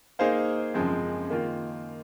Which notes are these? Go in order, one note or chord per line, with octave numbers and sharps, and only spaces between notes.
A#3 D#4 G#4 C5 F5
F#2 C#3 F3 G#3 C4
D#3 A#3 F4